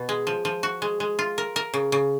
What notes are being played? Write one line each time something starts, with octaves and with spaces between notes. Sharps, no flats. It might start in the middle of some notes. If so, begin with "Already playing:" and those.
Already playing: B2
G#3
F3
F3
F#4
G#3
G#3
F4
A#4
A#4
C#3
C#3